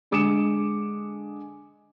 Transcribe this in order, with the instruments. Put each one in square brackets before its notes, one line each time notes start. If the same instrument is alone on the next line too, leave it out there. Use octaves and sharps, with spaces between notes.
[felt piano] D3 G#3 D6 D#6 C#7 E7